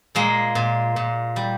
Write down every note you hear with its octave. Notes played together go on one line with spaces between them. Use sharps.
A#2 G#3 A#3
A#2
A#2
G3